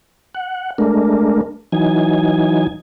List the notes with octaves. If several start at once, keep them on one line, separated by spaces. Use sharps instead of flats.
F#5
G#3 A3 D4 A#4
E3 F#3 D#4 G#5